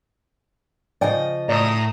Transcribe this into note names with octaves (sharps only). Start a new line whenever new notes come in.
C#3 F3 D5 D#5 G5 G#5
A2 D5 A#5 D#6